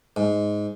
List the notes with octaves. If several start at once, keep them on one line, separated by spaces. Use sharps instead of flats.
G#2